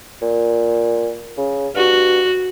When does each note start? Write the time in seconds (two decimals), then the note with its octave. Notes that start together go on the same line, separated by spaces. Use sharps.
0.22 A#2
1.38 C#3
1.75 G2 F#4